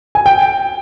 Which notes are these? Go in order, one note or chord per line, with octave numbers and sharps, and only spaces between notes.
G#5
G5